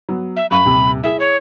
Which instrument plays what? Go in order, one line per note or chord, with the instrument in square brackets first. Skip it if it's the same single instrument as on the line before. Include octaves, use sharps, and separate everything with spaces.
[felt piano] F#3 B3
[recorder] E5
[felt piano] F#2 F5 C#6 [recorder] B5
[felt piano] D#1 C3
[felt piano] E4 G#4 [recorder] E5
[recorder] C#5